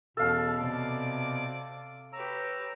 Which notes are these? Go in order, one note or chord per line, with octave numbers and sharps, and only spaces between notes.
E2 B2 C#4 A4 F5 A5
C3 D5 D6
G4 B4 C#5 A#5 E6